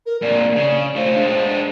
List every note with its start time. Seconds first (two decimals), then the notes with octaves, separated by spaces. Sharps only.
0.06 A#4
0.22 F2 A#2 D5
0.56 C#3
0.96 A3 F4 C5
1.14 G#3 D4